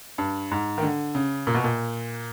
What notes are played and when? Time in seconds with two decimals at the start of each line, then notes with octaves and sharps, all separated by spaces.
0.18 G2
0.51 G#2
0.78 D#3
0.83 D3
1.15 C#3
1.47 A#2
1.55 B2
1.64 A#2